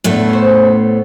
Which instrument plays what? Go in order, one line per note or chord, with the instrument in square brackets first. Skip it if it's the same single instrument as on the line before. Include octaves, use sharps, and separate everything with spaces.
[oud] E2 D4 B4 [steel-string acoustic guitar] A2 A3 B3
[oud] C#4 C5